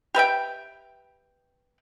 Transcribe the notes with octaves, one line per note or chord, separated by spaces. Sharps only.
G4 B4 E5 G5